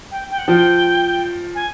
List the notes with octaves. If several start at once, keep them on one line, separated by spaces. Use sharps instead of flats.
G5
G5
F#5
F3 G5
G#5